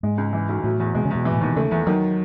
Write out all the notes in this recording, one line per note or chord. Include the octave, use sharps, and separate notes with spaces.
G#2 G#3
C#2
E3
B1
A2 F#3
E2
B2 G#3
C#3
E2 B2
E3
A2
D#2 B2
C#3 A3
E2 E3
D#3 F#3